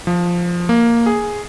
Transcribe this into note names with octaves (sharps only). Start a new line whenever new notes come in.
F3
A#3
G#4